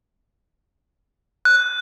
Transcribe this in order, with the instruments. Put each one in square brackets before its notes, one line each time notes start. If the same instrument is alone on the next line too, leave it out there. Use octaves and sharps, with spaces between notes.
[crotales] F#6